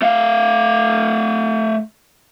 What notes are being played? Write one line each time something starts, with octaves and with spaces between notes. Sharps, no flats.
A3 F5